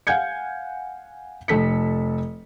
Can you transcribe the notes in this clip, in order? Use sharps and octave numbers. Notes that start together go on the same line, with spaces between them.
F5 F#5 G#5 G6 G#6 C#7
F1 A4 B6 C#7